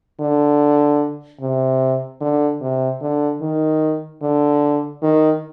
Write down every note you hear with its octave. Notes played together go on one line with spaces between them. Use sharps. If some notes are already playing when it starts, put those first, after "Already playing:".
D3
C3
D3
C3
D3
D#3
D3
D#3